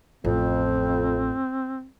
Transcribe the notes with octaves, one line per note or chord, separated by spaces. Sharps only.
A1 F2 C4